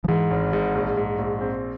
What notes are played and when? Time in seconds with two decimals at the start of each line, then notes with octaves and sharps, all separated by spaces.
0.04 F3
0.08 G#2 E3
0.31 G#1
0.53 G#2
0.75 A#1
0.97 G#2
1.19 A#1
1.41 C4